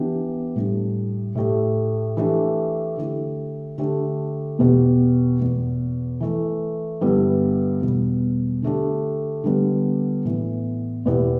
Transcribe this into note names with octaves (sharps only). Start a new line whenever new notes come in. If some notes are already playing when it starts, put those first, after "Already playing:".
Already playing: E3 B3 D4 G4
A2 G3 D4 G4
A2 A3 G4
E3 A3 D4 G4
D3 A3 E4 G4
D3 A3 D4 G4
E2 B2 B3 G4
E2 B2 B3
E3 A3 E4
G2 D3 G3 B3 E4
E2 B2 G3
D3 A3 D4 G4
D3 G3 B3
A2 E3 B3 E4
E2 B2 B3 E4 G4